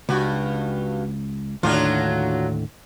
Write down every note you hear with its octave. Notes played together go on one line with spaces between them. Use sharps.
C#2 G2 F#4
D#2 A2 D3 F#3 D4 F4